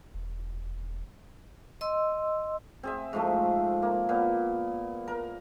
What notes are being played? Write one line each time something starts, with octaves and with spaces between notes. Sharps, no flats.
E1
D#5 C6 E6
C4 G#4 E5
G#2 F3 A3
A#3
A#2 B3
A#4